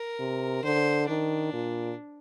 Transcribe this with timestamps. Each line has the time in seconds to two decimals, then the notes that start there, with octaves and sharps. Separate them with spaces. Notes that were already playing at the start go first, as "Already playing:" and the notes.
Already playing: A#4
0.20 C3
0.64 D3 C5
1.08 D#3 D4
1.53 A#2